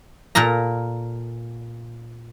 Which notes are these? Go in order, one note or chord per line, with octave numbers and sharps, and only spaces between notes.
A#2 A4 A#4 A#5